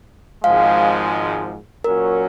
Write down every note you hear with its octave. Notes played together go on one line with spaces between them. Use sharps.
G#1 G#2 F3 G#3 F5
A#2 F#3 C#4 F#4 A#4